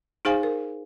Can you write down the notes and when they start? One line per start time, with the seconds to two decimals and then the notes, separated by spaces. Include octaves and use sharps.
0.25 D#4 G#4 C5 F5 G#5
0.43 A#4